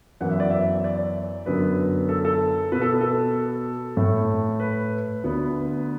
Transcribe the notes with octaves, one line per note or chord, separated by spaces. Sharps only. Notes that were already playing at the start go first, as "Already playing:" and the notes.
F#2 E3 B3 F#5
E5
D5
E5
D5
F#2 D3 B3 B4
A4
A4
B2 B3 B4
A4
A4
A2 A3
B4
D2 D3 B3